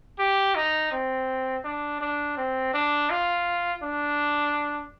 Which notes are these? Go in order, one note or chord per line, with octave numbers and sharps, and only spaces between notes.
G4
D#4
C4
D4
D4
C4
D4
F4
D4